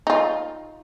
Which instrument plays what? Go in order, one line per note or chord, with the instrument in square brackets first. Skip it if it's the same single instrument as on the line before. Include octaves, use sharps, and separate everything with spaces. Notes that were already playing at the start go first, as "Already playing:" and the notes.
[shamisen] D#4 F4